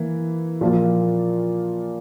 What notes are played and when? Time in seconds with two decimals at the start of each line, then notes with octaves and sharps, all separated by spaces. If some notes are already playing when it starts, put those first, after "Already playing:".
Already playing: E3 A#3 E4
0.61 A#2 F3 A#3 F4